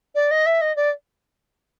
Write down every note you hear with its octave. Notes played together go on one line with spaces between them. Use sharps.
D5
D#5
E5
D#5
D5